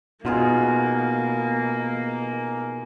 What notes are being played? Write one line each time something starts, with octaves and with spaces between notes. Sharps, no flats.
B2 A#3 D#4 F4 G#4